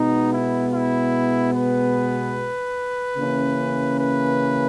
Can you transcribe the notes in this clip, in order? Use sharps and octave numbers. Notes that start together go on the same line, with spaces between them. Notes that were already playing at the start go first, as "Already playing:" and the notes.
Already playing: B2 G#3 B3 D#4
E4
E4
B4
C#3 E3 A#3 C#4
B4